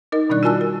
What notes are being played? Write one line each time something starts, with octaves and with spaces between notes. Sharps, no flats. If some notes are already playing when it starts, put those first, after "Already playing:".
D#4 A#4 D#5
B2 D#3 G3 D4 D5 F#6
F4 F#4 A#4 G#5 A5 E6
A#4